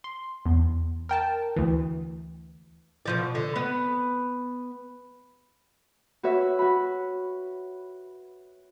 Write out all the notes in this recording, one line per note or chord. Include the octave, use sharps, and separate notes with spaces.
C6
E2
A#4 G5 A5
D2 E3
B2 F3 D5
D3
B3
F#4 B4 C#5 E5
F#4 B5